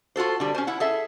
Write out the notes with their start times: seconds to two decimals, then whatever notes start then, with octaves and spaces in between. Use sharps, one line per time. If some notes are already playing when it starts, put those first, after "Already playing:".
0.16 F4 F#4 A4 C5
0.40 D3 G3
0.54 C#4 C5
0.67 E4 F#5
0.80 G#4 A4 E5